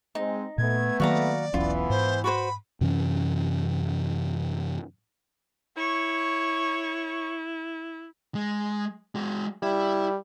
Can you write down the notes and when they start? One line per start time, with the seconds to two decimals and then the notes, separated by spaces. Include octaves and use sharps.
0.15 G#3 C4 D#4
0.58 A#2 A3 B3 G#6
1.00 D#3 F#3 A#3 F#4 D5 F5 A#5
1.54 E1 B1 E3 B3 C#4 E4 F4
1.90 G#2 C5
2.24 F#4 B4 C5 B5
2.81 F#2 C3 E3 C#4
5.77 E4 C#5 C#6
8.35 G#3
9.15 G#3 F#4
9.63 G3 E4